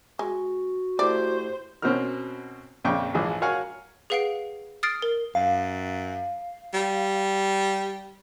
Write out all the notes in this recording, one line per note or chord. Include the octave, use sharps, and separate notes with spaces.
G#3 F#4
A3 E4 G4 C5 D5
B2 C4 C#4 F#4 A#4 F6
A#1 F2 A#2 C#3 G5 C#6
A#1 G#2 E3 G#4
F#4 A#4 C#5 F5 F#5 G#5
G#4 B4 F5 F#5 C7 D7
D#6 F6 A6 C7 D7
A#4
F#2 F5
G3